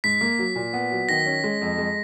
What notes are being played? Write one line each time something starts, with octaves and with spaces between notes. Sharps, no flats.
G#2 B6
A#3
F#3
A#2
B3
F#3
D#3 A#6
C#4
G#3
F2
G#3